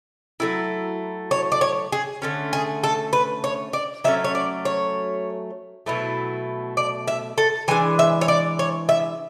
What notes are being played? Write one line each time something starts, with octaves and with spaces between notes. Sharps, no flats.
F#3 A3 E4
C#5
D5
C#5
G#4
D3 A3 C#4
G#4
A4
B4
C#5
D5
F#3 A3 C#4 E5
C#5
D5
C#5
B2 F#3 A3 E4
D5
E5
A4
E3 G#3 D4 G#5
E5
C#5
D5
C#5
E5